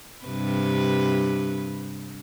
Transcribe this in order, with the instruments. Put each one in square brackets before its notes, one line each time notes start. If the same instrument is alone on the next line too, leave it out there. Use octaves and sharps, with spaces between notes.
[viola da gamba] G2 C3 B4